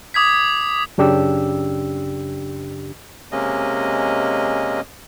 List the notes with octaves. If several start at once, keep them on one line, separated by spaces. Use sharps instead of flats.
D6 D#6 G#6 B6
F#2 C#3 D4 G4 E6
C3 G#3 A#3 C#4 D#5